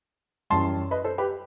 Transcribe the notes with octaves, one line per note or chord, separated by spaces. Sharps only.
F#2 E3 G3 A5 C6
B4 D#5
A4 C5
G4 B4